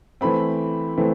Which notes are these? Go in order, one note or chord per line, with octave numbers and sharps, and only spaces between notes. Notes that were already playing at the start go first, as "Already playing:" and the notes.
E3 A3 C4 B5
E3 A3 C4